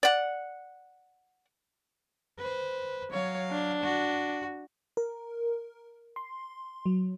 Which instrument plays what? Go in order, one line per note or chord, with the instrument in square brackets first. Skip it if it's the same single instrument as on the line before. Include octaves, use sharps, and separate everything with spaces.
[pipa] D5 F#5
[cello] B4 C5
[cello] F#3 F5 [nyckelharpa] C#5
[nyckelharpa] D4
[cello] F#4
[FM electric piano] A#4
C6
F#3